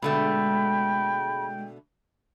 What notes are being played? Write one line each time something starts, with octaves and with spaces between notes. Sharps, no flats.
B2 D3 G#3 A3 G5 B5